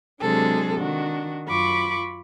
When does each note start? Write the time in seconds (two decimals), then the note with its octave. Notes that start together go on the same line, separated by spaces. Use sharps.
0.21 C3 F#3 G#3 D4 G#4 A4
0.78 D#3 D4 F#4
1.47 F#2 F4 B5 C#6 D6